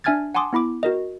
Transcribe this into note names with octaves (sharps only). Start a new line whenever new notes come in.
D4 E5 G#5 F6 G#6 A6
F#5 G#5 A5 C6 D6 D#6
B3 E4 B5 D6
F#4 A#4 D#5